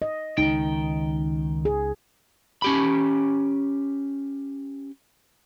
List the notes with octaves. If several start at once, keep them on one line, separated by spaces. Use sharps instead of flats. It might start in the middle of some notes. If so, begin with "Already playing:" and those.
D#5
C#2 D#3 D#4 G5
G#4
C#4 G4 B5